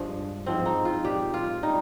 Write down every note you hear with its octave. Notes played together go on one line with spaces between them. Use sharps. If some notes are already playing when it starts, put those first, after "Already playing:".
Already playing: G2 F3 G#3
G#2 F3 G#3 C4
D#4
F4
A#2 G#3 G4
F4
G3 D#4